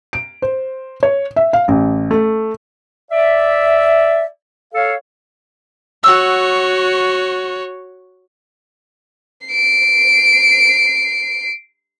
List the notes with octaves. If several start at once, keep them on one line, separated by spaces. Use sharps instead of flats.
D7
C5
C#5
E5
F5
A1
A3
D5 E5
A4 C#5 F5
F#4 C#5 F#5 E6
C7 D7